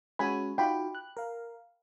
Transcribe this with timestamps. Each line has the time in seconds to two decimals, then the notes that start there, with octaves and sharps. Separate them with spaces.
0.19 G#3 C#4 F#4 G#5 B5
0.58 D#4 F4 F#4 G5 B5
0.95 F#6
1.17 A#4 F5